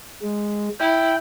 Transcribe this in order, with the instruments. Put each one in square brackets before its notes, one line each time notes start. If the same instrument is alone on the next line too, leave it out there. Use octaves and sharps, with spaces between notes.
[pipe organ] G#3
[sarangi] E4 [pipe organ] G5